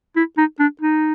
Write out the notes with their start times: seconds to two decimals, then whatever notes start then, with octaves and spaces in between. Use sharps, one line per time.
0.17 E4
0.37 D#4
0.60 D4
0.82 D#4